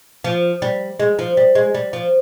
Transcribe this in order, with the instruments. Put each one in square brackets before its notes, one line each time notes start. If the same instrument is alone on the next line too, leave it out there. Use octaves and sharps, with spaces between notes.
[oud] F3
G3
G#3
F3
G3
G#3
G3
F3